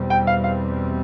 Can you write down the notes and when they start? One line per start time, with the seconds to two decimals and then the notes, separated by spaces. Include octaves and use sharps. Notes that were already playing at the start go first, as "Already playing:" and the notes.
Already playing: E2 B2 G3 C4
0.10 G5
0.27 F5
0.44 F5